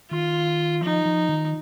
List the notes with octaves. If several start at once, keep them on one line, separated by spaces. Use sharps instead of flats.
D#3 F4
F3 D#4
F3
D#3